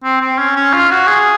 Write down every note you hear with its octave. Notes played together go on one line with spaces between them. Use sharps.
C4
C4
C#4
C#4
F4
F#4
G#4